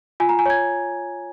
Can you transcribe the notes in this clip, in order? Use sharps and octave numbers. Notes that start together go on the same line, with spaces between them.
F4 G#5
A#5
G#5
C#5 G#6